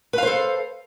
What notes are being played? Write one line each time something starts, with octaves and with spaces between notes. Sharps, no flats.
A4 B4 C5 F5